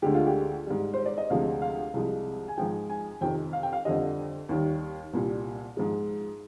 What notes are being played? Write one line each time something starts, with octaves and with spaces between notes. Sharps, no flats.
D2 D3 G#3 G4
F4
G4
G#2 G3
C5
D5
D#5
D2 C3 F3 G#3 F5
F5
C2 C3 F3 G#3
G#5
G#2 F3 G#3 G5
G#5
F2 C3 D#3 G5
F5
G5
F5
F2 D3 G3 D#5
D#2 D#3 G3
C2 A#2 G3
G#2 F3 G#3